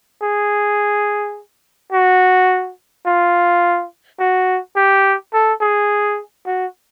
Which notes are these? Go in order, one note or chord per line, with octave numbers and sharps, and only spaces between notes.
G#4
F#4
F4
F#4
G4
A4
G#4
F#4